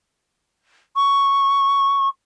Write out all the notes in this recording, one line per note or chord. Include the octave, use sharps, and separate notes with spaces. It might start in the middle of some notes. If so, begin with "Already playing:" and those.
C#6